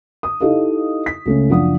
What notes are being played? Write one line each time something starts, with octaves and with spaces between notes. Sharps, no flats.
D#6
D#4 E4 G4 A4 D#5 F5
B6
C#2 A3 C#4
F#1 F3 D4 F#5 D#6